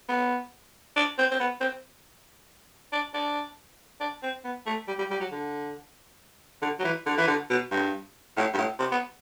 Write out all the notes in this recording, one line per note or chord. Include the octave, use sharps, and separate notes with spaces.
B3
D4
C4
C4
B3
C4
D4
D4
D4
C4
B3
A3
G3
G3
G3
F#3
D3
D3
F#3
E3
D3
E3
D3
B2
G2
A2
G2
A2
C3
B3